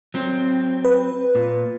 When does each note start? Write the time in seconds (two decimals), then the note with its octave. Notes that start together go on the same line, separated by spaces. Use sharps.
0.14 F#3 C4
0.85 B4
1.35 A#2